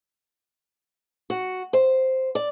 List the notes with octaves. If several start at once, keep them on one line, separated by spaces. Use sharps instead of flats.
F#4
C5
D5